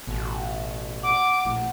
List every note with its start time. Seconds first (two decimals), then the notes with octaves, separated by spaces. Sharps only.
0.07 A1 B2
1.03 F#5 D6
1.45 A#1 A2